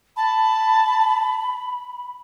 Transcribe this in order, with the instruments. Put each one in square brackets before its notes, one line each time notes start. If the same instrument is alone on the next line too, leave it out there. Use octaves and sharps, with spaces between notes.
[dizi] A5 [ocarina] B5